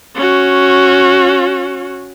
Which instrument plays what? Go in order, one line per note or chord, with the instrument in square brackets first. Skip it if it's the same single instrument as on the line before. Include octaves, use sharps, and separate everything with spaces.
[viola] C#4 F#4